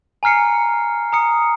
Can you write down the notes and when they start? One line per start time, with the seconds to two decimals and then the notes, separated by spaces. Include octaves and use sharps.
0.23 G#5 A#5 F6 C7 C#7
1.12 A#5 D#6 C#7